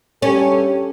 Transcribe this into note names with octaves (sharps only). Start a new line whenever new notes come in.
G2 C#4 G4 A4